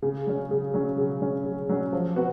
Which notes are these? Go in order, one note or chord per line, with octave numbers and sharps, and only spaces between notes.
C#3
F#3 C#4
C#3
F#3 C#4
C#3
F#3 C#4
C#3
F#3 C#4
F3
B3 F#4 B4